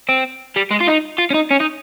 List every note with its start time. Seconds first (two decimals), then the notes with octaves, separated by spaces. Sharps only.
0.09 C4
0.56 G3
0.71 G#3
0.81 F4
0.87 D#4
1.19 F4
1.30 C#4
1.34 D#4
1.50 C#4
1.60 D#4